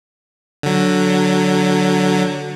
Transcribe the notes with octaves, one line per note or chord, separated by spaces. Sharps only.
D3 F#3